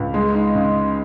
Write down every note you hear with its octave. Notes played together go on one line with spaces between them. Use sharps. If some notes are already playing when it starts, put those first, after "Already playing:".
Already playing: C#2
G#3
D#4
C#3